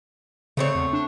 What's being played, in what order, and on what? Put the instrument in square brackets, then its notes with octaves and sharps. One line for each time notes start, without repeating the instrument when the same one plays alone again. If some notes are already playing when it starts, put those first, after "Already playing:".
[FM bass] C#3 [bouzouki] A3 C4 C#5
[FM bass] E2
D4